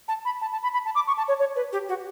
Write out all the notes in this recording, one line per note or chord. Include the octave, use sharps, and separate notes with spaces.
A5
B5
A5
A5
B5
B5
A5
D6
C#6
A5
C#5
C#5
B4
G4
F#4